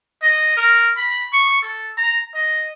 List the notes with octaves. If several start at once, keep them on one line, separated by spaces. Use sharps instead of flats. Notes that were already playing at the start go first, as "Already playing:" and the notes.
D#5
A#4
B5
C#6
A4
A#5
D#5